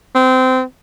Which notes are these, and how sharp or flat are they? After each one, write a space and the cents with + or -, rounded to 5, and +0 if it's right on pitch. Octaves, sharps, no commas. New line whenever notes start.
C4 -20